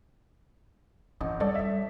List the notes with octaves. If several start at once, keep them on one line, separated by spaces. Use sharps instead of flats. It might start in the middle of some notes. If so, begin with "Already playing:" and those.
A1 C4
G3 A4 C#5 D5
E5